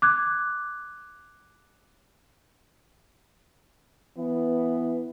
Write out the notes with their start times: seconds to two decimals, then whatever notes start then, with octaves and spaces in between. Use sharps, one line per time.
0.02 D6 F#6 G#6
4.18 E3 B3